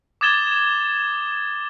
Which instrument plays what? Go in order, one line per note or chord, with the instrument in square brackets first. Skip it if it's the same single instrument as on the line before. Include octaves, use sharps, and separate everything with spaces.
[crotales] D6 D#6 G#6 A6 E7 G7